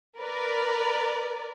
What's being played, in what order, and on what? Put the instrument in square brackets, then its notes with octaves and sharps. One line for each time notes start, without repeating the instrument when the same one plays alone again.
[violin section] A#4 B4 D5